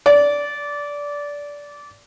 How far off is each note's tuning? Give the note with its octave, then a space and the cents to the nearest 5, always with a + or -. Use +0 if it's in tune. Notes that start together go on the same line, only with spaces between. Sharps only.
D5 -20